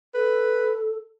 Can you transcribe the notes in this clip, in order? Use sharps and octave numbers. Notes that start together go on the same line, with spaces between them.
A4 B4